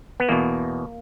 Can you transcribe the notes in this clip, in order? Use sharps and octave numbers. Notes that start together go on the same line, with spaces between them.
B3
E2 B2 A#3